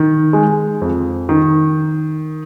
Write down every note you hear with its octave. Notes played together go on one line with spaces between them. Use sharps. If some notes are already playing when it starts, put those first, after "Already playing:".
Already playing: D#3
G#3
F2
D#3